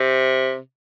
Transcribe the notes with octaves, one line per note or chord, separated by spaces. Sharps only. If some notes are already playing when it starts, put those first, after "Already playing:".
Already playing: C3